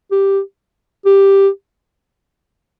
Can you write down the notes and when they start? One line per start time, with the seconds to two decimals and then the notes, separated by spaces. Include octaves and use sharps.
0.12 G4
1.06 G4